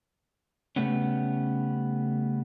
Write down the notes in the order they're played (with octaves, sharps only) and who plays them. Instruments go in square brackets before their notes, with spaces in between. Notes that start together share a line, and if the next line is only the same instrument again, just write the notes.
[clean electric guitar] C#3 F#3 G3 A3 B3 C#4